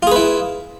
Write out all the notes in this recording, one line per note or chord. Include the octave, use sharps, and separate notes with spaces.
E4 F4 G#4 B4